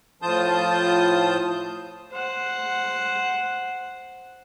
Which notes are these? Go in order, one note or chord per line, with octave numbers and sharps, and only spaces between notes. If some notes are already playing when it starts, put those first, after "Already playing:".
A2 F3 F4 A5 D#6 G6
C5 F#5